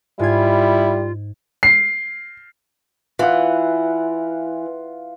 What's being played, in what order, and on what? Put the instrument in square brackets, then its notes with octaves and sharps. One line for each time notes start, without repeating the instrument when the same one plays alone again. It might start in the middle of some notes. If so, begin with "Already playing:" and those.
[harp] G#2 G#6 [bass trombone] G3 [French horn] E4 [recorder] F4
[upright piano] C7
[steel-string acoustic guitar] E3 [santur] F4 F#5